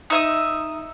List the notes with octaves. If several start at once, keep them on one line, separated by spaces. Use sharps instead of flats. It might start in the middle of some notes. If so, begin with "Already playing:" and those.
D#4 E5 D#6